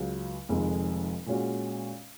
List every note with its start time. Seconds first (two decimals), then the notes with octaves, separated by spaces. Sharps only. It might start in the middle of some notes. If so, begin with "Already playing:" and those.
Already playing: C#2 C#3 F#3
0.49 F1 F2 D#3 G#3
1.26 A#2 G#3 C#4 F#4